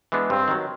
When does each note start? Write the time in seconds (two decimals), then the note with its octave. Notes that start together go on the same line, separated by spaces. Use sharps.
0.12 E3 G#3 B3 D4
0.30 G2 C4
0.48 D#3 F#3